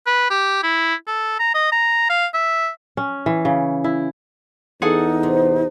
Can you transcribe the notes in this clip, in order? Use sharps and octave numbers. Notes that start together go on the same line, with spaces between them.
B4
G4
E4
A4
A#5
D#5
A#5
F5
E5
C#4
E3
C#3
E4
E2 D#4 G#4 A4 F#5
C3